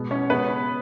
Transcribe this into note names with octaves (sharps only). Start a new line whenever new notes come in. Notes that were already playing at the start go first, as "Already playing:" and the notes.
Already playing: B2 G#3 B3
C#4 C#5
C#3 G#3 B3 C#4 B4